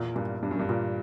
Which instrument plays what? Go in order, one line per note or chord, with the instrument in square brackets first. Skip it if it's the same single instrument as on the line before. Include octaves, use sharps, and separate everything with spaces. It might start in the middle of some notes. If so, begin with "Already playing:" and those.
Already playing: [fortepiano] E2 A#2
[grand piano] G2 [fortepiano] A#2
[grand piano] G2 [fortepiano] D4
[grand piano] F#2
G2
[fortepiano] A#2